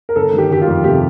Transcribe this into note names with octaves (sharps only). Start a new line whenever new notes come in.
A#4
G1 A4
D#3 G4
G1 G4
F4
F2
C3 G4